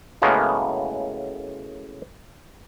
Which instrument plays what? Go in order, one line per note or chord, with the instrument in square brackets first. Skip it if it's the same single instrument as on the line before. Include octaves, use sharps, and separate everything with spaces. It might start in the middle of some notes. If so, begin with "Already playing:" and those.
[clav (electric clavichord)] F#2 A2 C#3 G#3 A#3 B3